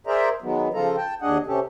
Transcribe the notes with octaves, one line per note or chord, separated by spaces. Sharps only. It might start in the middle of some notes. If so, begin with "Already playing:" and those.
G#4 A#4 C5 D5 E5 A#5
D#3 F#3 G#3 B3
C#3 F3 F4 A4 A#5
G5 A5
D#2 D4 G#4 D#5 F#5
C3 C#4 G4 A4